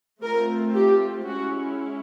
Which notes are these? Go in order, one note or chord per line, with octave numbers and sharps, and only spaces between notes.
A3 C4 F4 A#4
G4
G#3 C#4 E4 F#4